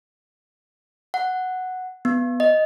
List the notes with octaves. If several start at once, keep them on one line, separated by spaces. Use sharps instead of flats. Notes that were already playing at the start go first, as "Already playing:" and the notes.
F#5
B3
D#5